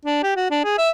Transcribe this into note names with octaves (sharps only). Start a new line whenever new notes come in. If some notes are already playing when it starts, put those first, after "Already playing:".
D4
G4
F#4
D4
G#4
E5